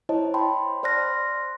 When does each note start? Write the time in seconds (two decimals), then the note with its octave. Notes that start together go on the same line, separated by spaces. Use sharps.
0.09 E4 C5 C#5 D#5 A5
0.34 G5 A5 B5 C6
0.83 C5 D5 C6 F6 F#6 A#6